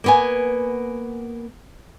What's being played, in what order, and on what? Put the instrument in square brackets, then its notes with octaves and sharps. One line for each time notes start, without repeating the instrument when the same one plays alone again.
[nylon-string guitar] A#3 B3 G#5